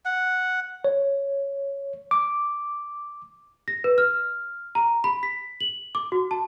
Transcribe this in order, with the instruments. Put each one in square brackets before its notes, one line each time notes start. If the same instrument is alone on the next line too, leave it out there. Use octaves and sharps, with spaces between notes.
[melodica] F#5
[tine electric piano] C#5
D6
[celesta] A#6
B4
F6
A#5
B5
B6
F#7
D6
F#4
A5